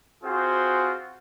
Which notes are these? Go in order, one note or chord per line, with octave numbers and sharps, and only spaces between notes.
C4 F4 F#4 G#4 C5